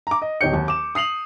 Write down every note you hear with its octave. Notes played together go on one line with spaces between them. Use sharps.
A#5 D6
D#5
D1 D#4 G4 C#5 G6 C#7
D#2
D6 E7
D#6 C7 F7 F#7